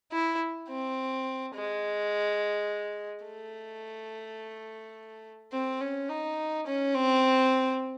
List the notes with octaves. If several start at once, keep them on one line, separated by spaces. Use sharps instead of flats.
E4
C4
G#3
A3
C4
C#4
D#4
C#4
C4